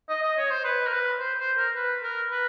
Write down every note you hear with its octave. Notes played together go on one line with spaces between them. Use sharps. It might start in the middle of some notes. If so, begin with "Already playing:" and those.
D#5
D#5
C#5
C5
B4
A#4
B4
C5
C5
A#4
B4
A#4
B4